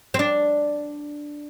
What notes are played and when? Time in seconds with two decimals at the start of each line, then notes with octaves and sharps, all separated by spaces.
0.14 C4
0.19 D4